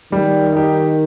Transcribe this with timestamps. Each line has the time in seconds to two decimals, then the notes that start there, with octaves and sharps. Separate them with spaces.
0.12 D#3 G3
0.53 D#4 G4